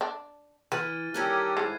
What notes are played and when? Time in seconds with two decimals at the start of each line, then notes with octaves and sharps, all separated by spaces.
0.01 D4
0.72 E3 B4 F6 A6 D#7
1.14 D#3 G3 C#4 G4 A4 A#4 F#6 G#6
1.57 G#2 E4 G#4 A4 C7